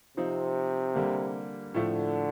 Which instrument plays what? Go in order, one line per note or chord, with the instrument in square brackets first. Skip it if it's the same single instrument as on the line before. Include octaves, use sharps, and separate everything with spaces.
[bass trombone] C3 [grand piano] F3 C4 D#4
[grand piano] D3 G3 A#3
[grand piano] A2 F3 A3 [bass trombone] D3